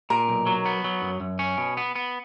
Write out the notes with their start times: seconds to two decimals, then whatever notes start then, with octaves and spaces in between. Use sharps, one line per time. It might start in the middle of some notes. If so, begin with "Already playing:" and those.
0.10 A#2 A#4
0.29 B1
0.46 F#3
0.66 B3
0.84 F#3
1.02 F#2
1.20 F#2
1.39 C#4
1.58 B2
1.77 B3
1.96 B3